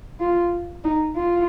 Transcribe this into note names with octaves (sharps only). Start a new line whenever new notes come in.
F4
D#4
F4